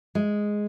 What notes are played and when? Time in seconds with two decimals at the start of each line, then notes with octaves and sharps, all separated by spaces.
0.15 G#3